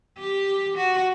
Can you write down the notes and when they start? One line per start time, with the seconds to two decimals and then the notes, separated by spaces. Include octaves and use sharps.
0.18 G4
0.76 F#4